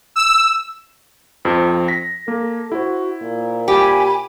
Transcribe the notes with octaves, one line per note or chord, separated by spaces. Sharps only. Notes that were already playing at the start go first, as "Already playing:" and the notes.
E6
F2 F3 C4
A#6 B6
A#3 A4
E4 F#4 C5
A#2
G4 G#5 B5